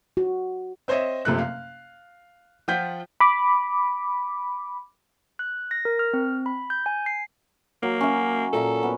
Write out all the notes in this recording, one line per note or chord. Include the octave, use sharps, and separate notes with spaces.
F#4
C4 C5 C#5 D#5 E5
F#1 C3 F3 A3 F#6
F5
F3 F4 F#5 G5 G6 B6
B5 D6
F#6
A#6
A#4
F6
C4
B5
G6
G#5
C7
F#3 A#3
C#4 E5
A#2 A4 A#4 E5
B3